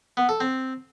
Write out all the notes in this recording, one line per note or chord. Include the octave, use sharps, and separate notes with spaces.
B3
A4
C4